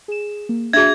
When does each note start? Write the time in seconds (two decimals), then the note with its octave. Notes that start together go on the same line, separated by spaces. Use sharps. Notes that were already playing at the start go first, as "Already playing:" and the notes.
0.08 G#4 E7
0.49 A#3
0.73 D4 F#4 G#4 E5 G#6